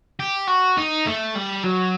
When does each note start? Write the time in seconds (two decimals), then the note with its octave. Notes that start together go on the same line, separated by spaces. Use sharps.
0.20 G4
0.48 F#4
0.77 D#4
1.06 A3
1.35 G3
1.64 F#3